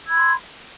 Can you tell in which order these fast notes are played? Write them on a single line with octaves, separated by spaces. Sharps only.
E6 G#6 B5 C6